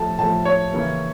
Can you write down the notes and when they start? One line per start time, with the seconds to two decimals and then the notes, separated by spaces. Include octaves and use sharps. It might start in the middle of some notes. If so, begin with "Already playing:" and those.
Already playing: A2 F3 A3 A5
0.19 A2 F3 A3 A5
0.45 C#5
0.72 C#3 E3 A#3